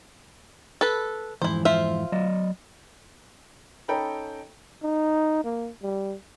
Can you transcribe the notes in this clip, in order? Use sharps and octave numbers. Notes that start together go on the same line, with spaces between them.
A4 B4
F2 G#2 E3 E4 C5
F4 C5 E5
F#3 D5 D#5
C#4 D#4 A4 G5 A#5 B5
D#4
A#3
G3